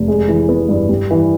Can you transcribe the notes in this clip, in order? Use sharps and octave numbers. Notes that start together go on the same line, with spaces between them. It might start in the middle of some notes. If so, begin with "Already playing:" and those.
Already playing: F1
G#3
E3
B3
G2
G3
E3